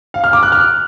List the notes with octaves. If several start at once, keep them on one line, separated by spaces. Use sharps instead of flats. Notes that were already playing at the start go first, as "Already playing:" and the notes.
F5
F6
D6
F#6
F6